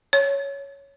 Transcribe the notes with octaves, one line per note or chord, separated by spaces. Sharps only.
C#5